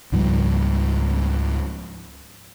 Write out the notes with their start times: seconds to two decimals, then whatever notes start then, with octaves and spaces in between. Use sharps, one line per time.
0.12 C#2 G#2 F3 G3